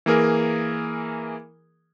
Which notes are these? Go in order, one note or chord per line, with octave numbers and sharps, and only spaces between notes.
E3 A#3 G#4 A#4